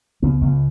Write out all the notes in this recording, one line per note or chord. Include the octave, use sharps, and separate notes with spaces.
C#2 B3
C#2